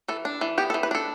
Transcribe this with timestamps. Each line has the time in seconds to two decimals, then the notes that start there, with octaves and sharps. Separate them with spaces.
0.08 E3 A4
0.25 D4
0.41 E3
0.58 B3 G4
0.70 A4
0.74 E3
0.83 B4
0.91 D4 A4